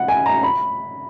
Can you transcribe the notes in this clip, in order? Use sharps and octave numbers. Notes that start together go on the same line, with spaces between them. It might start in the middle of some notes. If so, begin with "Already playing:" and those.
Already playing: F#5
G#5
A#5
B5